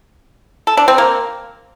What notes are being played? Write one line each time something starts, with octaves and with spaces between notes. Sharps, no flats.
A4
D4
C4
A#3